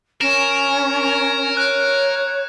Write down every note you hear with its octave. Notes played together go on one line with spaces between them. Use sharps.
C#4 A#4 E7
C#5 F#6